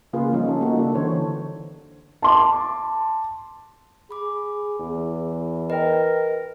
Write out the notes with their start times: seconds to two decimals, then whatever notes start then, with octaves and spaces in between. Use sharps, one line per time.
0.13 C#3 A#3 F4 G#4 B4
0.32 F3 G3 C#4 D#4
0.48 A4
0.61 A#3 D#4 F#4 G4
0.77 C#3 D4 A4
0.94 D3 E3 C5 C#5
2.22 A5 C6 D6
4.11 G#4 B5 D6
4.79 E2
5.70 A#4 B4 D#5 G5